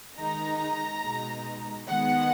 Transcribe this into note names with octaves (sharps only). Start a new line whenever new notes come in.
D#3 G#3 D#4 A#5
B2 G#3 D#4
D#3 G#3 B3 F#5